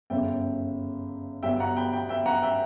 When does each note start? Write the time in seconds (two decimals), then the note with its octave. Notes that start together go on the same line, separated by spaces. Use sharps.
0.10 G1 F#2 C#3 E5 G5
1.43 G1 G2 F#3 B3 E5 G5
1.60 F#5 A#5
1.77 G5 B5
1.93 G5 B5
2.09 E5 G5
2.26 F#5 A#5
2.43 E5 G5